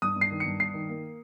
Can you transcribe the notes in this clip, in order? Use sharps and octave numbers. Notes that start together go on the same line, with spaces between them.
G2 D#6
G2 C7
D#3
C#7
G2
G2 C7
D#3
A#3